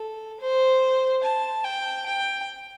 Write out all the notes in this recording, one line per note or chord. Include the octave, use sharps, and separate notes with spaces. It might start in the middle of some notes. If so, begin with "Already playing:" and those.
Already playing: A4
C5
A5
G5
G5